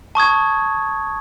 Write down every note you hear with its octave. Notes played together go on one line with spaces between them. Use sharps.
A5 C#6 D#6 G#6